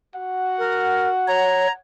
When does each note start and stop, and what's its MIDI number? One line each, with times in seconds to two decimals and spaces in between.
0.15 1.71 66
0.15 1.77 78
0.58 1.09 70
1.28 1.67 73
1.28 1.72 82